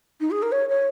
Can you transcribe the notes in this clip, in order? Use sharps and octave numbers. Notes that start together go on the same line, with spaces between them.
D#4
G#4
A#4
C#5
C#5